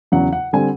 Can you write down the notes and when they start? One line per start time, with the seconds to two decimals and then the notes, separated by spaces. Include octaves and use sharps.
0.12 E2 C#3 F#3 F#5
0.33 F#5
0.53 D3 G3 C4 G#5